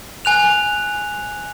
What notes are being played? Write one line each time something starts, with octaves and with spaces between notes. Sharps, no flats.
G#5 F#6 F7